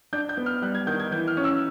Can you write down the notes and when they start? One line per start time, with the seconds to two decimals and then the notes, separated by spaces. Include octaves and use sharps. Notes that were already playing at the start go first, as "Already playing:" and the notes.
0.13 D4 G6
0.29 G6
0.37 B3
0.46 F6
0.62 G3 F#6
0.75 G#6
0.87 D#3 G6
1.00 G#6
1.11 E3 G6
1.28 F6
1.37 C#4
1.44 E6